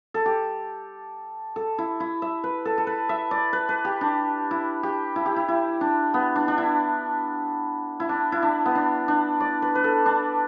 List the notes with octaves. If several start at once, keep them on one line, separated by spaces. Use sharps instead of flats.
A4
G4
A4
E4
E4
E5
B4
A4
A4
B4
E5
D5
B4
B4
G4
D4
E4
G4
E4
G4
E4
E4
D4
B3
D4
D4
E4
E4
D4
E4
D4
B3
D4
D4
D5
B4
B4
A4
D4